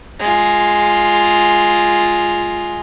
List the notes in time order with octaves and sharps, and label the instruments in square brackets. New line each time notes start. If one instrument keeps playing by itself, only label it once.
[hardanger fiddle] G#3 F4